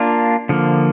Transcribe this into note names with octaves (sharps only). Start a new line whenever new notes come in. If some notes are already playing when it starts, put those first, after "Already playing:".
Already playing: A#3 D4 F4
D3 F3 A#3